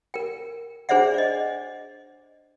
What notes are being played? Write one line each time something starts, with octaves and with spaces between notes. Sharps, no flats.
A#4 G5
D4 G#4 C5 D5 E5 F#5
D5 D#5